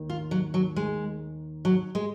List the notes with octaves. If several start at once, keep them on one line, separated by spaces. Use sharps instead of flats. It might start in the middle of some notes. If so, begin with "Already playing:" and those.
Already playing: D#2 D#3
F4
F#3
F#3
G#3
F#3
G#3